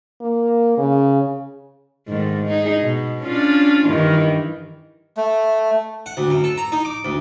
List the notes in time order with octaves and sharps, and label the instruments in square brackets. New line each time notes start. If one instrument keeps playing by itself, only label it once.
[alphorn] A#3
C#3
[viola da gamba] G#2 D#3 A3
D#4 G#4
B2
C#4 D4 F4
G2 D#3 E3
[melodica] A3
[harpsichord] F#5
D2
F#2
A4
A#5
D#4
D6
D2